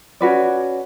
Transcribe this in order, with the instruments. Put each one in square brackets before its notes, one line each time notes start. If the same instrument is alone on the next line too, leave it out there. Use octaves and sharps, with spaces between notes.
[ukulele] C#4 F#4 B4 D5